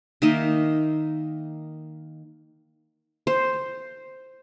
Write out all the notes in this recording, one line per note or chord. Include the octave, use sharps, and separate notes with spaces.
D#3 A#3 D#4 E5
C5